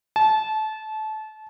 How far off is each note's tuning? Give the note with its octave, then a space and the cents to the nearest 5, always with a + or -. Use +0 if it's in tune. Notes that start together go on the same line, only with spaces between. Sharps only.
A5 -25